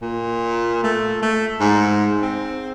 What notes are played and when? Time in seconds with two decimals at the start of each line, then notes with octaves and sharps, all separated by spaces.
0.02 A#2
0.84 A3
1.22 A3
1.60 G#2
2.22 C4